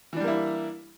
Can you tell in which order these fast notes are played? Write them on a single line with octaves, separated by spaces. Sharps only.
E3 D4 G3 A#3 E4